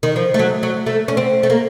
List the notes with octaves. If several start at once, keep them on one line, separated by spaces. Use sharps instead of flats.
D#3
F3
A3
F#3
F#3
A3
C#4
C4
A3
A#3